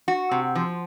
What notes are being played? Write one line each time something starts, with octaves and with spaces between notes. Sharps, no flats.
F#4
C3
F3